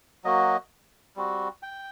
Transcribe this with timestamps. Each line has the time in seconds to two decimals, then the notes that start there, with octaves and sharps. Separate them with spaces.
0.24 F#3 A#3 F#4 D#5
1.16 G3 C4 F#4
1.63 G5